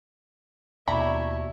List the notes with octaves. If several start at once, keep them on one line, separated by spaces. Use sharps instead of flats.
D#2 B2 A3 E4 C#5 D5 A#5 B5